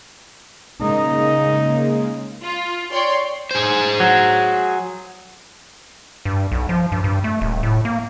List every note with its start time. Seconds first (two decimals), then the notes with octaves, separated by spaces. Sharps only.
0.81 C#3 G#3 A#3 D#4
2.42 F4
2.91 C#5 D5 G5 C6
3.51 G#4 C5
4.00 F#3
6.25 G2
6.52 B1
6.69 F3
6.92 G2
7.04 G2
7.24 A3
7.41 D#1
7.63 A2
7.85 A#3